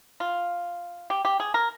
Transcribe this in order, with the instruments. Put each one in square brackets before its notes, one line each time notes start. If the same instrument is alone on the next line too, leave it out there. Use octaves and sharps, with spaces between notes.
[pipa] F4
G4
G4
G#4
A#4